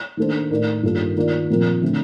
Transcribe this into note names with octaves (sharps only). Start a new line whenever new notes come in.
D#3 A#3 D4 A4 C5
A2 A3 D#4 A#4 D5
G2 D#3 A#3 F4 A4
D#3 A#3 F4 A#4 D5
A#2 F3 C4 F4 A#4
D3 A3 C4